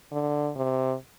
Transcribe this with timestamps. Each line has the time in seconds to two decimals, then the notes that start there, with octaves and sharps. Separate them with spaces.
0.12 D3
0.55 C3